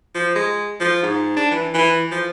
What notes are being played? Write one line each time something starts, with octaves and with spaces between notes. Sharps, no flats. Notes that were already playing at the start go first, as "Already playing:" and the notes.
F3
G#3
F3
G#2
D4
E3
E3
F3